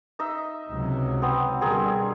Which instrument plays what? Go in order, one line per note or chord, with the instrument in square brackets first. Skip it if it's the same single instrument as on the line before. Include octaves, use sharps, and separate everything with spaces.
[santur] D#4 D#5 E5
[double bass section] C#2 C3 F#3
[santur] B3 C4 D#6
[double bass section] B2 D3 G3 [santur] C4 G#4 A#4